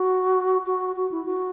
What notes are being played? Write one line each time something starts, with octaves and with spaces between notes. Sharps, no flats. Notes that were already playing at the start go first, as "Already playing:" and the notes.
Already playing: F#4
F#4
F#4
E4
F#4